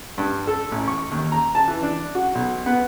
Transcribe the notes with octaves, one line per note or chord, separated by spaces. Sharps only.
G2
A4
A1
C#6
D#2
A#5
A5
E3
D4
F#4
B1
B3